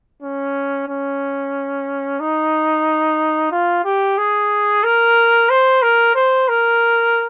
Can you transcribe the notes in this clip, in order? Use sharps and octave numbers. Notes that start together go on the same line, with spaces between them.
C#4
C#4
D#4
F4
G4
G#4
A#4
C5
A#4
C5
A#4